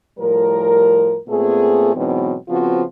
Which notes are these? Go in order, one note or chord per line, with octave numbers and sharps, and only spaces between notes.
A2 F3 G3 A#4
A#2 A3 B3 C4 G#4
G#2 B2 E3 F#3 B3 C4
C#3 F3 B3 C4 F4 F#4